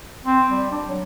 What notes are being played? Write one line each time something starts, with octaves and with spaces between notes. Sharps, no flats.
C4
G3
D4
F#3